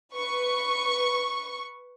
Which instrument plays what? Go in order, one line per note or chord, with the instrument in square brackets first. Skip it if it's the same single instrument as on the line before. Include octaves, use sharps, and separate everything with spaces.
[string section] B4 C#6